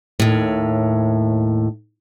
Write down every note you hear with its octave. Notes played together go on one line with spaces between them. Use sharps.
D#2 A2